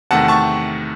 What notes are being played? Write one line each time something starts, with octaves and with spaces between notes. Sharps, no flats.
E2 C3 D#3 A3 F#5 A5
A5 C#6